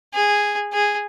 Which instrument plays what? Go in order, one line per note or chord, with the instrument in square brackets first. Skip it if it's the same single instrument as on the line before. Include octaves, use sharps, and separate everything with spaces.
[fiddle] G#4
G#4